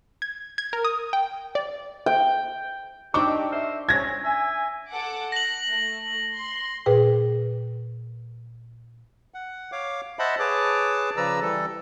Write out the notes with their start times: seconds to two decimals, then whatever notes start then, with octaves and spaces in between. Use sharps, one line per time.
0.22 G#6
0.58 G#6
0.73 A#4
0.84 D#6
1.13 G5
1.55 D5
2.06 G5
3.14 C4 D4 D#4 G4 G5 C#6 D6
3.52 A#4 C5 E5
3.89 C4 C#4 G#6 A#6
4.25 E5 G#5
4.91 A4 F#5 D6
5.32 F#6 A#6 F#7
5.69 A3
6.35 C6
6.86 A#2 G#4 B4 G5
9.34 F#5
9.72 C#5 F5 D6
10.19 C5 D#5 E5 F#5 A5 B5
10.39 G#4 B4 C#5 A5 D6
11.17 C#3 F3 B4 D5 A#5 E6
11.42 E3 G3 A4